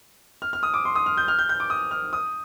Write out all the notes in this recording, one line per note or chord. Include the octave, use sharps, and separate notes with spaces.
F6
F6
D#6
D6
C6
D#6
F6
G6
F6
G6
G6
D6
D#6
F6
D#6